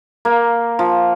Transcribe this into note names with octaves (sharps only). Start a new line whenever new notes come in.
A#3
F3